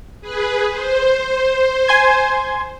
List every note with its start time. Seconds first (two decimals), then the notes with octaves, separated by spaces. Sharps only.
0.21 G#4 B4
0.70 C5
1.88 G#5 C6 G#6